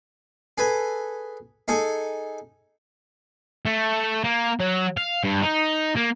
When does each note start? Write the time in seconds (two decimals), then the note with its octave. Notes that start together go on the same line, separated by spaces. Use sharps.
0.58 G#4 A4 B4 G#5
1.68 D#4 G#4 A4 G#5 C#6
3.66 A3
4.24 A#3
4.60 F#3
4.97 F5
5.24 G2
5.42 D#4
5.96 A#3